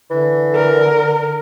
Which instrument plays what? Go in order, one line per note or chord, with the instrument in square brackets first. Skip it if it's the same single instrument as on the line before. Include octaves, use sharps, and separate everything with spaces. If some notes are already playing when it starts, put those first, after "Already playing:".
[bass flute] D3 [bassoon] E3
[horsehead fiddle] A#4